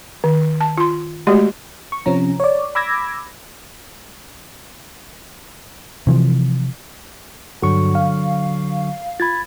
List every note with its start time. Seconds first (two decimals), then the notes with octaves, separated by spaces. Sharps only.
0.24 D#3
0.61 A5
0.78 F4 C6
1.27 G#3 A3 F#4 G4 D5
1.92 C#6
2.06 C3 F3 C#4 A#5
2.40 C#5 D5
2.75 B5 D6 E6 G#6 A#6
6.07 C3 E3 F3
7.62 G2 D3 F#3 F#4 C#6
7.95 F5
9.20 F4 B5 G#6 A6